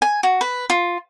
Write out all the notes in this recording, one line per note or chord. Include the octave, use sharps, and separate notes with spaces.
G#5
F#4
B4
F4